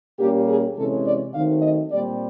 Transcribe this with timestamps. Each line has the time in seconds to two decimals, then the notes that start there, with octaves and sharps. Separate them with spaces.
0.19 A#2 G3 A#3 C#4 G4
0.48 G#4
0.76 C3 E3 G#3 C#4 A4
1.05 D5
1.33 D#3 F#3 A3 C4 F5
1.62 D#5
1.91 A#2 G3 C4 D5